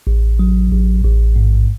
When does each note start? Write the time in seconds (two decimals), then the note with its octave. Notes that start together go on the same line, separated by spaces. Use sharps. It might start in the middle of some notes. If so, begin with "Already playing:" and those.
0.07 A1
0.39 F#3
0.72 A1
1.04 A1
1.36 G#2